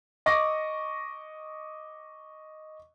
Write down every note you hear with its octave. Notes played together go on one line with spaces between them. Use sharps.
D#5 C#6 D6 A#6